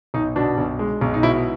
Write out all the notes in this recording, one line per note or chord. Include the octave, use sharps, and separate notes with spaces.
B1 D#4
B2 D4
B1
G#3
B1
D#4
B2 E4